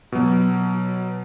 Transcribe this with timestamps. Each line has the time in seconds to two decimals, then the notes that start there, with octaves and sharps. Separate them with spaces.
0.12 B2 F#3